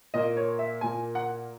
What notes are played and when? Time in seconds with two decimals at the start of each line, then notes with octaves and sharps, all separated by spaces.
0.14 A#2 A#3 D#5
0.37 C#5
0.59 E5
0.81 A#2 A#3 G#5
1.15 F#5